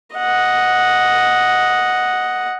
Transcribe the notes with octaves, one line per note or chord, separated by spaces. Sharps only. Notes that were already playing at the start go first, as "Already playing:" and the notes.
D#5 F#5